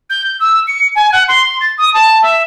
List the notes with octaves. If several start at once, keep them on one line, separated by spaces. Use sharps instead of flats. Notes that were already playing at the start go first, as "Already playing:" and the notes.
G6
E6
C#7
G#5
F#5
C6
A6
D#6
A5
E5